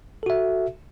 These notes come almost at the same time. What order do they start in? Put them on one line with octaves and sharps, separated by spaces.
A4 F#4 E5